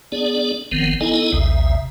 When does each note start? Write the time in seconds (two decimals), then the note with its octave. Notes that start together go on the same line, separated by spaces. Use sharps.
0.12 B3 D4 G#4 D5
0.72 F#1 D#3 F3 B3 C4
1.01 B3 D#4 E4 A4 D#5 G#5
1.32 A#1 D#2 C3 E5